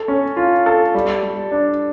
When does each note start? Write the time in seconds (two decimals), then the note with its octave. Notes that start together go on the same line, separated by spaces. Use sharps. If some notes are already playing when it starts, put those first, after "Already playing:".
Already playing: A4
0.08 C#4
0.37 F4
0.66 A4
0.94 G3
1.23 G3
1.51 D4